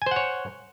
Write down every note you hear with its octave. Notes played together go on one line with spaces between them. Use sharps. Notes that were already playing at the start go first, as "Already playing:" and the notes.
C5 C#5 F#5 G#5